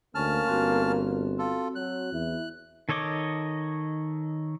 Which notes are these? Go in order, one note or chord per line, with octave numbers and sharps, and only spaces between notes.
D2 A#3 C#4 A5 F6
G1 C4 F#4
F4 A4
F#3 F#6
E2 E4
D#3 A4 C#5 D#5 D6